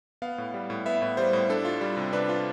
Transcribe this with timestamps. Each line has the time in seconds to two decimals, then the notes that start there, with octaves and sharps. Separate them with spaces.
0.22 B3 F5
0.38 A2
0.54 G3
0.70 A2
0.86 B3 E5
1.02 A2
1.17 G3 C5
1.33 A2
1.50 D4 A4
1.65 F4
1.81 G3
1.97 C3
2.13 D4 B4
2.29 F4